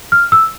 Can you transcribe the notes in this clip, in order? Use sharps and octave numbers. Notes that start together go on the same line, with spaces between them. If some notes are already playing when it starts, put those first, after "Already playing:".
F6
E6